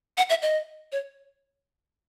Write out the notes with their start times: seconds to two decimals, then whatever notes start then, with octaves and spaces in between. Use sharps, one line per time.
0.17 F#5
0.30 E5
0.42 D#5
0.92 C#5